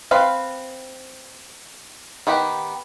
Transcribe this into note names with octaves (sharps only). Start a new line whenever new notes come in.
C4 B4 F5
D#3 B3 G4